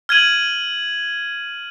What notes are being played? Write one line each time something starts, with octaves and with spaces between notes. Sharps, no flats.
F6 G#6 D#7 F#7